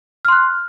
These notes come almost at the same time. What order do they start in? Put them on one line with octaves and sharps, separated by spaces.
F6 C6 F#6